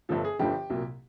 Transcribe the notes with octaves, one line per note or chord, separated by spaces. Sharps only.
G1 G2 D3 F3 A4
G#4
G1 G2 D3 F3 G4
C2 A#2 F#3